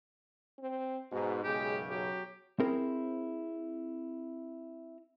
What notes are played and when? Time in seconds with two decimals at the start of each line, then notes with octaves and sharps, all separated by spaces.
0.59 C4
1.11 G#2 B2
1.44 B1 F#2 C#3 G#3 G4
1.90 F#3 G4
2.60 C4 E4 G#4 A#4 C5